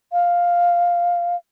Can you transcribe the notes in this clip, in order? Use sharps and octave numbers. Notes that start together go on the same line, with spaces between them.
F5